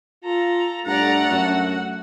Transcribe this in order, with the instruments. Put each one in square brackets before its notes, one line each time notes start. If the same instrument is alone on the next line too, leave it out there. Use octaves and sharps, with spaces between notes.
[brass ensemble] F4 [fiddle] A4 A#5
[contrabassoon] G2 [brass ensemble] A3 [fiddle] D5 A#5 [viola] F#5
[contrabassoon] F#2 [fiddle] F#4